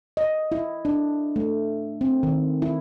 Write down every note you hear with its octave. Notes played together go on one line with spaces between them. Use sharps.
D#5
E4
D4
A3
C4
D#3
E4